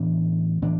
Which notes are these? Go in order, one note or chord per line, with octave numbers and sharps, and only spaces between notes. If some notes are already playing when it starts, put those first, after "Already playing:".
Already playing: A2 E3 B3 D4
A2 E3 B3 D4